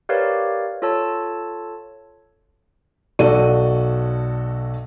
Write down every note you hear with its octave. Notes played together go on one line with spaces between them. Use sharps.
G4 A#4 B4 C#5 D5 F5
F4 A4 C#5 A5 E6
B1 F#4 A4 D5 D#7